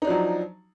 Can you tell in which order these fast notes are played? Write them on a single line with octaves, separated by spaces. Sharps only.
D#4 D4 F3 F#3